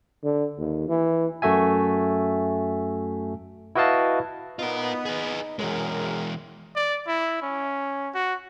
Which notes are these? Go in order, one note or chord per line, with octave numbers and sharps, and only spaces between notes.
D3
D#2
E3
F#2 A3 F#4 E5 G#5
E4 F#4 B4 D#5 F5 A5
B3 D#4 F4 A#4
G#4 B4
F#2 E3 G#3 F#4 G#4 A#4
D5
E4
C#4
F#4